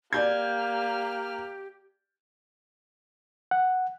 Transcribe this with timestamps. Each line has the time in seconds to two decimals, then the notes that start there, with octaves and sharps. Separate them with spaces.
0.13 A#3 G4 D5 F6 G6 G#6
3.51 F#5